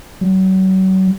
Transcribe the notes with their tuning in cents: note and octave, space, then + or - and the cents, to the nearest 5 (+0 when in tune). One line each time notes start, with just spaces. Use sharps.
F#3 +35